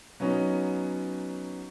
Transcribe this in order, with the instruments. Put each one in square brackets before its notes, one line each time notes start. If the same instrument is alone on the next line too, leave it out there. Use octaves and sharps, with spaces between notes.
[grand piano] F#3 B3 C#4 D#4